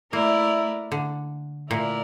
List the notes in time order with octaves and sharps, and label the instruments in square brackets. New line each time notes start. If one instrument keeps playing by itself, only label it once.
[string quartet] A3 E4 A#4 D5 [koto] A#3
[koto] D3
[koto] A#2 [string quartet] A3 E4 A#4 D5